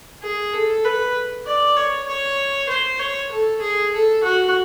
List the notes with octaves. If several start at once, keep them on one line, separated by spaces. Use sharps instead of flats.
G#4
A4
B4
D5
C#5
C#5
C5
C#5
A4
G#4
A4
F#4